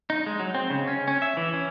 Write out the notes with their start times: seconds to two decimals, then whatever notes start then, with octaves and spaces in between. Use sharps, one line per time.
0.10 D#4
0.26 G#3
0.40 F#3
0.54 C4
0.70 C#3
0.88 C#4
1.08 C#4
1.22 E5
1.37 E3
1.54 C#4